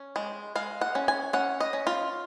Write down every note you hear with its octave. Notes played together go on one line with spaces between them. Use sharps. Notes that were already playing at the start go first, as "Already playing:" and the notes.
Already playing: C#4
G#3
G#3 F5
F#5
C#4
G#5
C#4 F#5
D#5
C#4
F4